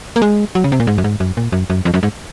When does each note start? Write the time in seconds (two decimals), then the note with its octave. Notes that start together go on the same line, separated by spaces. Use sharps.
0.16 A#3
0.22 G#3
0.55 F#3
0.64 C#3
0.72 C3
0.80 A#2
0.87 G#2
0.98 F#2
1.04 G#2
1.20 F#2
1.37 A#2
1.52 F#2
1.70 F#2
1.85 F2
1.94 F#2
2.03 G#2